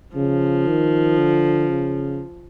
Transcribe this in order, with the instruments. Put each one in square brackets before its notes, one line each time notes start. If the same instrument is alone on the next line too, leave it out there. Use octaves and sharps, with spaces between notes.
[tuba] C#3 [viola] F3
[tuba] D#3
D3
C#3